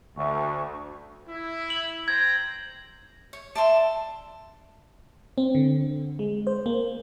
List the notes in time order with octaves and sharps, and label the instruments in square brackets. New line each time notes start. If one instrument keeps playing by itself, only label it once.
[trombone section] D2 [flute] C#6
[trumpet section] E4
[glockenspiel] F#7
[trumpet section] C5 G5 A#5 [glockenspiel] G#6
[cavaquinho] C#5
[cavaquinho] D5 E5 C6 [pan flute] A5
[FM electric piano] C4
D3
G#3
C5
A#3